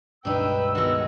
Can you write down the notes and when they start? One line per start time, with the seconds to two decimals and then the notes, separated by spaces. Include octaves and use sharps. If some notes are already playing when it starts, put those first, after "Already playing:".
0.25 C#2 G2 B2 D4 D#4 B4 G5 E6
0.75 D#3 G#3 B3 F#4